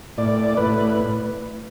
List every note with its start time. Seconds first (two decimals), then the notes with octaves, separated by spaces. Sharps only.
0.18 A2 D5
0.57 A2 B4